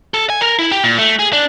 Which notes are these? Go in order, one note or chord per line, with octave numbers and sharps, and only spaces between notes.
A4
G#5
A#4
E4
G4
A#2
A3
G#4
D4